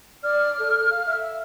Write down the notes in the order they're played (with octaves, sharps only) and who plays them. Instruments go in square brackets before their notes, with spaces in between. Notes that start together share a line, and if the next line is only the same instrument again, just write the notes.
[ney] D5 [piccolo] F6
[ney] A4
F5
E5